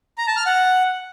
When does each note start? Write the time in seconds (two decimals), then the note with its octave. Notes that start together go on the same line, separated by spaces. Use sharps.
0.18 A#5
0.27 A5
0.37 F6
0.46 F#5